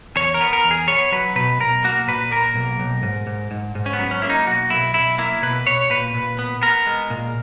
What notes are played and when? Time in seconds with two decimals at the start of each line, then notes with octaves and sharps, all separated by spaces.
0.16 E2 C#5
0.34 A#4
0.41 B3
0.53 A#4
0.65 E2
0.71 G#4
0.88 B3 C#5
1.12 F#3 B4
1.35 B2 B4
1.60 B1 A#4
1.84 A#3 F#4
2.08 A#2 B4
2.32 A#3 A#4
2.56 B1
2.80 B1
3.03 G#2
3.27 G#2
3.51 G#2
3.75 G#2
3.86 C#4
3.93 B3
3.99 F#3
4.11 C#4
4.22 A#3 E4
4.30 D#4
4.47 B1 F#4
4.70 B1 E4
4.94 B1 E4
5.18 A#3 E4
5.42 B2 B4
5.66 B2 C#5
5.90 A#2 B4
6.15 A#2
6.39 B3
6.62 B3 A#4
6.87 G#3
7.10 A#2